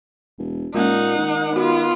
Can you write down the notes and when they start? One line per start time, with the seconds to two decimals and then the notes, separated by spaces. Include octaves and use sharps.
0.39 E1
0.74 A#2 G#3 A#3 C#4 D#4 F#5
1.18 D#3
1.56 B3 F4 F#4